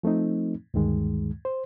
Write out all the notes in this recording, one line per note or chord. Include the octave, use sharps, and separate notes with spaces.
F3 A3 C4 D#4
D2 G2 D#3 G#3
C5